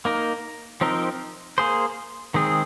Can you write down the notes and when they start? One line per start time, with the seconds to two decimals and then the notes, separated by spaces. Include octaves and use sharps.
0.05 A#3 D#4 A#4
0.81 F3 C4 D#4 A#4
1.58 A#3 G#4 C5
2.34 D#3 G#3 C4 G#4